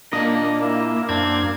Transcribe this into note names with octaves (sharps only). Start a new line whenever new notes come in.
A#2 A#3 D4 D#5
E4
F#2 C4 D4 G#6